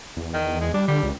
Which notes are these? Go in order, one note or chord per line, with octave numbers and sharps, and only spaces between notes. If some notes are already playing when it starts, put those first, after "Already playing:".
E2
D#3
G#3
G3 D4
D3 G3
C#2